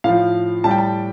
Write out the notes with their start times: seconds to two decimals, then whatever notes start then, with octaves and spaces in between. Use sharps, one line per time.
0.04 A2 F3 F5
0.64 A2 G3 A5
0.71 G5
0.78 A5